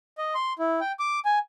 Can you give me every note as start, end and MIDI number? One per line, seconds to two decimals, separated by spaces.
0.18 0.34 75
0.35 0.53 84
0.59 0.80 64
0.81 0.92 79
0.99 1.20 86
1.25 1.39 80